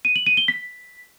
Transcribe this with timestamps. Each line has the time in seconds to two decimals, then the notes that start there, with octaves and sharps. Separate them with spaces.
0.05 D#7
0.16 F#7
0.26 D#7
0.37 G7
0.48 B6